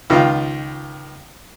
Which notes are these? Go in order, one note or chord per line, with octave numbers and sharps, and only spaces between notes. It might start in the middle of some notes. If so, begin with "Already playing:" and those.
C#2 D#3 F4 F5